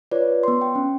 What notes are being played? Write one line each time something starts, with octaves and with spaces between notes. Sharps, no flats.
F4 B4 C#5 D5
B3 C6
G5
C#4